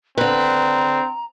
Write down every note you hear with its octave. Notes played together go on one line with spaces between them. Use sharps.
D3 C4 B4 A#5